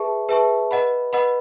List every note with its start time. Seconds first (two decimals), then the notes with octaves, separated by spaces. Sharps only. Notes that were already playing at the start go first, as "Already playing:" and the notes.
Already playing: G#4 B4 E5 A5 C#6
0.29 G#4 B4 E5 A5 C#6
0.71 B4 D#5 F#5 B5
1.13 B4 D#5 F#5 B5